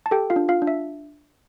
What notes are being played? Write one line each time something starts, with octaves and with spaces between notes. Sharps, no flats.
A5
G4 A4 G5
F4 F5
D4
F4 F5
D4
E5